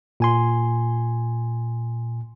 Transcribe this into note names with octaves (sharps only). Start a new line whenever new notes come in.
A#2 G#5 C6